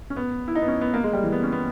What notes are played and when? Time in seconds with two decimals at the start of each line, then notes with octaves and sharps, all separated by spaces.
0.10 C#4
0.16 B3
0.48 E4
0.55 D#4
0.62 B3
0.68 C#4
0.81 B3
0.94 A#3
1.03 G#3
1.13 G3
1.23 E3
1.32 B3
1.43 C#4
1.52 B3